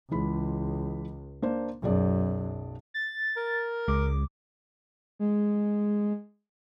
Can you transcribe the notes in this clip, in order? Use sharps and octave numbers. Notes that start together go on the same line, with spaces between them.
C#2 E3 G#3 B5
A#3 D4 C5
B1 F#2 G#4 D5
A6
A#4
C#2 G#3 D6
G#3